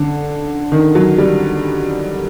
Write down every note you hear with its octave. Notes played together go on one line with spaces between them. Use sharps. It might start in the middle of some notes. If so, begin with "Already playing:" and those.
Already playing: D3
D#3
F#3
G3